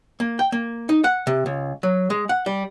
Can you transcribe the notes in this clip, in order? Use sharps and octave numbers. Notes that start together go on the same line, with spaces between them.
A#3
G5
A#3
D#4
F#5
C3
C#2
F#3
G#3
F#5
G3